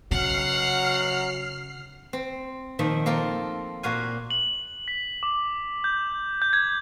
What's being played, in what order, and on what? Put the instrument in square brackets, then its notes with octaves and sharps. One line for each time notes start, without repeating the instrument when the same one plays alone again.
[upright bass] C#3 [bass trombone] F#3 [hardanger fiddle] F#5 [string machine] F6 C7
[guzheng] C4
A#2 D#3 F3 E5
A#3 C4 F4 A4 A#4
A#2 F#4 F5 G#5
[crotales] F#7
B6
D6
G6
G6
G#6